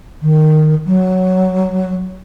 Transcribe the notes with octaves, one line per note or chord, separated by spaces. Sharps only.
D#3
F#3